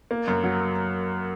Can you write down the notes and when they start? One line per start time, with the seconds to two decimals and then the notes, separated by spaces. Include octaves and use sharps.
0.11 A#3
0.28 F#2
0.44 F#3